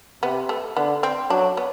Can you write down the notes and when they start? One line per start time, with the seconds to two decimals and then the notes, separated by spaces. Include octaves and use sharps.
0.23 C3 B3
0.49 A3
0.77 D3 B3
1.03 C4
1.30 F#3 D4
1.57 B3